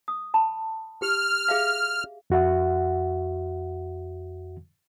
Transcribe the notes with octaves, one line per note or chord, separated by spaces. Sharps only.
D#6
A5 B5
G4 F6
G#4 E5 F5
F2 F#4 E5 F#5